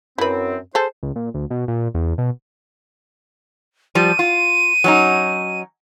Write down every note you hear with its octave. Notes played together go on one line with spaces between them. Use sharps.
F#2 C4 E4 B4
G#4 A4 C5
C#2
A#2
D2
B2
A#2
E2
B2
F3 G3 D#7
F4
F#3 C#4 D#4